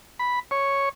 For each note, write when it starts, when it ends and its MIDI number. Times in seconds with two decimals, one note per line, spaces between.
0.19 0.39 83
0.51 0.89 73